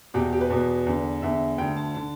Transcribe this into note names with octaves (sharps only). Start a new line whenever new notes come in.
E2 B2 G4
G4
B4
E2 B2
E2 D3
E2 D3 E5
D2 D3 G5
A5
D3 A5